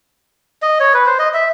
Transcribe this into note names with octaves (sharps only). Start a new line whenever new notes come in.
D#5
C#5
B4
C5
D#5
E5